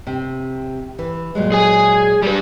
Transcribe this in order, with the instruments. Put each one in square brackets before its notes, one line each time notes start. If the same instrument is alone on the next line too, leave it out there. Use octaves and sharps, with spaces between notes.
[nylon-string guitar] C3
E3
A#2 F#3 G#3
[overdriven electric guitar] G#4 G#5
G3 B4